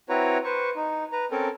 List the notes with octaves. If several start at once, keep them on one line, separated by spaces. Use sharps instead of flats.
C4 E4 F#4 B4 C#5 A#5
B4 C5 C#6
D#4
B4 A#5
C4 C#4 A4 A#4